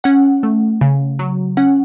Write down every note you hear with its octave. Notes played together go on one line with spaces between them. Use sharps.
C#4 F#5
A3
C#3
F#3
C#4 F#5